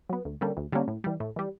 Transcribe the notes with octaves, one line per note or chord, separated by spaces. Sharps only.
F#3 B3
D2
D3 G3 A#3 C#4
D2
D3 G3 A#3 C#4
A2
E3 G3
A2
E3 G3